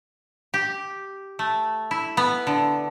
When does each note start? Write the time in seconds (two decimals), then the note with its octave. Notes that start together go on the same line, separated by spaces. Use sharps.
0.54 G4
1.39 A3
1.91 E4
2.17 B3
2.47 D3